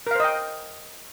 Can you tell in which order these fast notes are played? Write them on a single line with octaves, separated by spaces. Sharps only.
A#4 F5 C5 D#5 G5